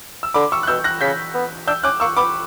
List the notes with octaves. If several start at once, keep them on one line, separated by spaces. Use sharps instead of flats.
E6
D3 B5 D6
C#6 E6
F#6
B2 E6 G6
F#6 A#6
C#3 G6 B6
B3
D4 E6 G6
C#4 D6 F#6
A#3 C#6 E6
B3 B5 D6